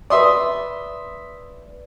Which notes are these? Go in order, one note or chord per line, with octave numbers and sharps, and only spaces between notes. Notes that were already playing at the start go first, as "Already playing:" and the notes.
B4 D5 E5 C6 D#6